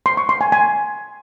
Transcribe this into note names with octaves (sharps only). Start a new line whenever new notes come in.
C6
C#6
C6
G#5
G#5